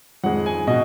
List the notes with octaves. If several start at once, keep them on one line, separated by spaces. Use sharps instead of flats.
F2 D#3 G#3 F#5
G#5
B2 D#5